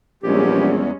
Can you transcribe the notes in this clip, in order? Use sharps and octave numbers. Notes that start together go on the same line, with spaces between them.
A#1 E2 G3 G#3 C#4 G4